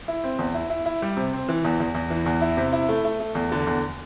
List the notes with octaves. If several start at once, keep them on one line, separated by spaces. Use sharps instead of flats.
E4
C4
E2
E4
E4
E4
G3
C3
C4
E3
E2
E2
E2
E3
E2
E4
C3
E4
A3
A3
A3
E2
D3
E2